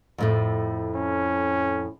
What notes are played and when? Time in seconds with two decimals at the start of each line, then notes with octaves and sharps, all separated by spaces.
0.18 F2 A2 A3
0.95 C#4